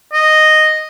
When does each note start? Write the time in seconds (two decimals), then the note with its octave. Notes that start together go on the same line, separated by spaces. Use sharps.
0.13 D#5